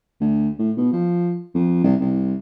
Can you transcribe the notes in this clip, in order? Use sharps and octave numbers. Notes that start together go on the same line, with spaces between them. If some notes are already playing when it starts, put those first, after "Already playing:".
D2
A2
B2
F3
F2
C2
C2